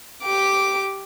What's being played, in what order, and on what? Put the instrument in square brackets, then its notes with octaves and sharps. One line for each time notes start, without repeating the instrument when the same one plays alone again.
[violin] G4 D6